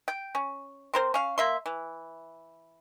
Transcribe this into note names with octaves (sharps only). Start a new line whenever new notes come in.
G5
C#4
C4 A#4 C5
C#4 F5
A#3 E5 C6
E3